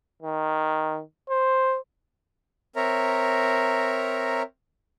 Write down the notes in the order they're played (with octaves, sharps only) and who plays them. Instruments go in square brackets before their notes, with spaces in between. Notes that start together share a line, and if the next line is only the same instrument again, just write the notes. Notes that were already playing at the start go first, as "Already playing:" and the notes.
[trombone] D#3
C5
[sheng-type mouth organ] C4 A#4 C#5 E5 A#5